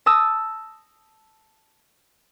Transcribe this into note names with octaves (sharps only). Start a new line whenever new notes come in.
A5 D#6 E6 A6 A#6